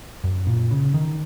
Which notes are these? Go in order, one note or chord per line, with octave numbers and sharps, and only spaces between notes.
F#2
A#2
C#3
D#3